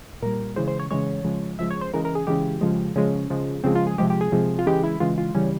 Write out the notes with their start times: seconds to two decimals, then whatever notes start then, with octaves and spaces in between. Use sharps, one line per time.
0.22 A#2 G3 A#4
0.56 C#3 E3 G#3 C5
0.68 C5
0.79 C#5
0.91 C#3 E3 G#3 C#5
1.24 C#3 F3 G#3
1.59 C#3 F3 G#3 E5
1.71 C#5
1.81 C5
1.93 C#3 E3 G#3 A#4
2.05 A#4
2.15 G#4
2.27 C#3 E3 G#3 G4
2.61 C#3 F3 G#3
2.96 C#3 F3 G#3 C#4
3.30 C#3 F3 G#3
3.64 C#3 F3 G#3 C4
3.75 F4
3.87 G#4
3.98 C3 F3 G#3 G4
4.10 G4
4.21 G#4
4.32 C3 F3 G#3
4.59 F4
4.66 C#3 E3 G#3 G4
4.83 E4
5.00 C#3 E3 G#3 F4
5.18 F4
5.35 C#3 E3 G3 C#4